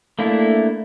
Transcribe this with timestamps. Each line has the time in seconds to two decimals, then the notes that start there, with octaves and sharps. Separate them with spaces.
0.19 A3 A#3 D4 E4